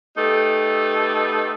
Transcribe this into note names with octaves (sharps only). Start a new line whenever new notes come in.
A3 B3 D#4 G4 A4